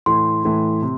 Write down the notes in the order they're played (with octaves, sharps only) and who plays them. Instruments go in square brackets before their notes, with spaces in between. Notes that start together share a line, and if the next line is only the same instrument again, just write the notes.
[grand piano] A2 E3 A3 E4 [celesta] C6
[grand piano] A2 E3 A3 E4
C3